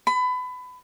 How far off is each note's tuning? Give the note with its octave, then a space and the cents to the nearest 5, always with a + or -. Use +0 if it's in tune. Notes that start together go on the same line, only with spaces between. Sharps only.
B5 +25